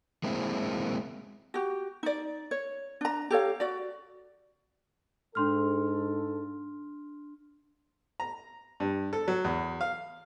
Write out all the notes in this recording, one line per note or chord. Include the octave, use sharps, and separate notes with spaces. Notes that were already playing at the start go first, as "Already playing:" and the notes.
G#3 A#3 C4 E4
F#4 G4
D#4 D5
C#5
D4 A#5
G4 A4 C#5 F5
F#4 D5
G#2 D4 A4 C6 F6
A#5
G2
A4
F#3
E2
F5